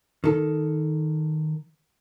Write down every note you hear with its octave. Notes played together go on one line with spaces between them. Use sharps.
D#3 A4